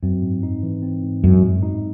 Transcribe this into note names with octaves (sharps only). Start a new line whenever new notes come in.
F#2 C4
G#2
D#4
E3
C4
G#2
F#2 G#3
A2
D#4